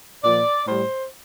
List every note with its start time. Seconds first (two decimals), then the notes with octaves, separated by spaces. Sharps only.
0.23 A#2 F3 D5
0.66 A2 G3 C5